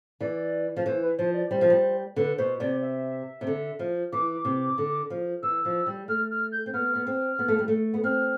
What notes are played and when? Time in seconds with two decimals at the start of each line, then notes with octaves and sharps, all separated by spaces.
0.20 E3 D5
0.76 F3
0.86 E3 C5
1.02 B4
1.18 F3 C5
1.34 D5
1.51 G3 C5
1.61 F3
1.70 G3
2.16 D3 B4
2.38 B2 C5
2.60 C3 D5
2.82 E5
3.41 C3
3.47 D3
3.79 F3
4.12 E3 D6
4.45 C3
4.78 D3
5.10 F3
5.42 E3 E6
5.65 F3
5.86 G3
6.08 A3 F6
6.31 F6
6.52 G6
6.66 C4
6.74 B3 F6
6.95 B3
7.07 C4
7.39 B3
7.48 A3
7.59 G3
7.68 A3
7.94 B3
8.04 C4 F6